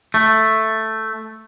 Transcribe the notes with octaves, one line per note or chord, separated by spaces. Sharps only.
A3